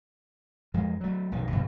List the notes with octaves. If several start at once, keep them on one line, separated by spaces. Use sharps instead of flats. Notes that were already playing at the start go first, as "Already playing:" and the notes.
F2 F3 G#3
F#3 A3
B1 F2 D#3
G2 B2 D3 F#3